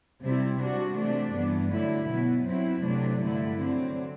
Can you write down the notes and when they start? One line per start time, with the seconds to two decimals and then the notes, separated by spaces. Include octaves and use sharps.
0.22 C3 G3 C4 E4
0.60 C3 G3 D4 F#4
0.97 C3 E3 A3 D4
1.34 G2 E3 B3
1.72 D3 F#3 A3 E4
2.09 B2 F#3 B3
2.47 F#2 F#3 C4 E4
2.84 C3 F#3 A3 D4
3.22 G2 D3 A3 E4
3.60 D3 F#3 C4